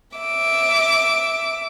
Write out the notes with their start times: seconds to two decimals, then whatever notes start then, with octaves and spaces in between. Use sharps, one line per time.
0.17 E5 D6